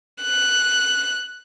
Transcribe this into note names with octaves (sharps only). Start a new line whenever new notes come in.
F#6